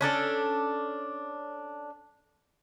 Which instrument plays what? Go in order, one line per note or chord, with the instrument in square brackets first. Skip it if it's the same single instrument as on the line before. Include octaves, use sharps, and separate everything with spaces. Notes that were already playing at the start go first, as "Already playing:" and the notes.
[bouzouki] C#4 D4 A4 D5